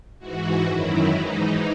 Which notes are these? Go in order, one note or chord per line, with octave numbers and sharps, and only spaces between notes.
G#2 E3 F#4
F#2 D#3 F#3 E4
G#2 E3 D#4